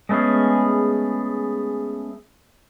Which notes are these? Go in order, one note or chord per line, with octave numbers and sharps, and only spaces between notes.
G#3 A3 B3 C#4 G#4